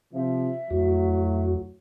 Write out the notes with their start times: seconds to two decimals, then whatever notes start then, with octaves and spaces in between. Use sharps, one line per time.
0.14 C3 F3 E5
0.71 F2 A2 F#3 F#4